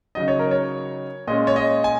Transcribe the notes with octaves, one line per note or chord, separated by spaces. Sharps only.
C#3 F#3 D#4 D#5
C#5
A#4
C#5
A#2 G#3 C#4 D#5
C#5
D#5
G#5